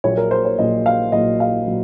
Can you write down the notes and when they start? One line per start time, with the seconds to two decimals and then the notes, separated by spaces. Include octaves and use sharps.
0.04 A#1 A#2 F#3 C#5
0.17 A#4
0.31 C5
0.45 C#5
0.59 A#1 A#2 F#3 D#5
0.86 F5
1.12 A#1 A#2 F#3 D#5
1.40 F5
1.67 A#2 F#3